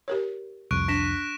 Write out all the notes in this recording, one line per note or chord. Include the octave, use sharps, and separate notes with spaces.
G4 A#4 C#5
C2 F2 C#6 F#6 D7
D4 A#6 B6 E7